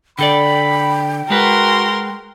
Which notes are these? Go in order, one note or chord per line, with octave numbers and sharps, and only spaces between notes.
D3 A4 D5 G5 B5
G#3 F#4 A#4 B4 C6